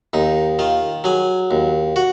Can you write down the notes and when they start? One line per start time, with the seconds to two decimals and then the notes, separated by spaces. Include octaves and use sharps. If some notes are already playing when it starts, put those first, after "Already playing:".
0.13 D#2 D#4
0.59 D#3 F4
1.04 F#3 G#4
1.51 D#2
1.96 F#4